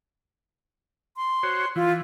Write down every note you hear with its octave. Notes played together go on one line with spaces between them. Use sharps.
C6
F#4 C5 C#5
E3 F4